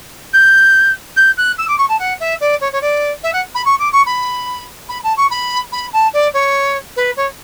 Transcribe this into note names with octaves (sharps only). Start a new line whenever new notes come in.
G6
G6
F#6
E6
D6
C#6
A5
F#5
E5
D5
C#5
C#5
D5
E5
F#5
B5
C#6
D6
C#6
B5
B5
A5
C#6
B5
B5
A5
D5
C#5
B4
C#5